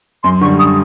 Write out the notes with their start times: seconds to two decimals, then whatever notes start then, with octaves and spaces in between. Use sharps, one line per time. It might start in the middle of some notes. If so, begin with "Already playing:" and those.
0.24 F#2 C6
0.41 D3 C#6
0.45 G3
0.59 D#6